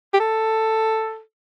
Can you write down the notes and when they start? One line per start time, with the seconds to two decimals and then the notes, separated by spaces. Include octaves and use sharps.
0.14 G4
0.20 A4